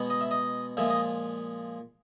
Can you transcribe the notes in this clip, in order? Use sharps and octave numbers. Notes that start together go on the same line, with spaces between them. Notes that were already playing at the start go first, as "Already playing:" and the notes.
Already playing: B2 G#3 B3
D#5
E5
D#5
A#2 F3 G#3 E5
D#5